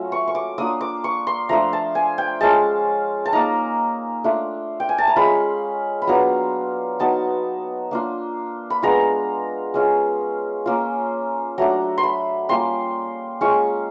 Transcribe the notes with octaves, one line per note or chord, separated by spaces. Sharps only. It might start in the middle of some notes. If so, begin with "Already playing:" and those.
Already playing: F#3 A3 C#4 F4
C#6
C#6
D6
A#3 D4 F4 D#6
D6
C#6
C6
F3 A3 D4 F4 A#5
A5
G#5
G5
G#3 C#4 F4 A5
A5
A#3 D#4 A#5
A3 D4 F4
G5
G#5
A5
A#5
G#3 C#4 F4 B5
B5
F#3 B3 D4 F4 A#5
F#3 B3 D#4 A5
A#3 D4 F4
B5
G#3 B3 D4 F4 A#5
G#3 C#4 F4
A#3 C#4 F4
F#3 A3 D4 A#5
C6
B5
G3 A#3 C#4 F4 C6
G#3 C#4 F4 C#6